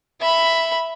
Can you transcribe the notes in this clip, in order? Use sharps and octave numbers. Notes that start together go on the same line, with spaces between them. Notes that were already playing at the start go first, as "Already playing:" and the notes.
E5 B5